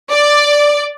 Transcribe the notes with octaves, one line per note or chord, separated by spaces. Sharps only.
D5